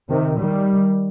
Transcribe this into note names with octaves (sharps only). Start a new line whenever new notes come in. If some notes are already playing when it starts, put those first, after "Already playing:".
C3 D#3
D#3 G3